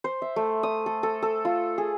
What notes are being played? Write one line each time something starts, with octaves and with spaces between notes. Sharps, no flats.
C5
E5
A3
D#6
A4
A4
A4
F4
G#4